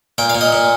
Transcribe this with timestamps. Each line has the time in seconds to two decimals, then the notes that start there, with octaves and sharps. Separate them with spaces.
0.18 A#2 G5
0.30 F5
0.35 A#2
0.41 D#5
0.52 A#2